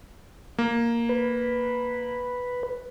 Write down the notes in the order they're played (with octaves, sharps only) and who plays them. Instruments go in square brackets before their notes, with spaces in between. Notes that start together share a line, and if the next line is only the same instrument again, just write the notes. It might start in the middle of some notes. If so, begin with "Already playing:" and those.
[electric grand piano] A#3
[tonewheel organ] B4